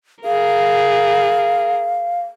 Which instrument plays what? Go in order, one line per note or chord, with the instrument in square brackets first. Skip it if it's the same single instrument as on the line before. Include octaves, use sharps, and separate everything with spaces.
[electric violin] G#4 A#4 [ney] F5